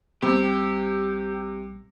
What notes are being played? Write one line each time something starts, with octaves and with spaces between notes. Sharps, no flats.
A#1 C3 G3 G4